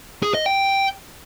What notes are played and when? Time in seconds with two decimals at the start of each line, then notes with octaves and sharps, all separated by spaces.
0.23 G#4
0.34 D#5
0.46 G5